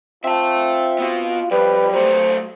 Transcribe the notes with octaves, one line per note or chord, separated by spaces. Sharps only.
C4 F4 E5 A5
B3 F#4
F2 G3 B4
F#3 A3 C5